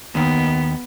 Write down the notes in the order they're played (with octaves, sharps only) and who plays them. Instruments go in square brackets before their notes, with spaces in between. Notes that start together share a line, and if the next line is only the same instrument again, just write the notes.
[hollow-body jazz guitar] D#2 D#3 [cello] B3